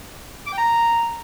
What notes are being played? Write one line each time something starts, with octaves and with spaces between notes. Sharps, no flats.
D6
G5
A#5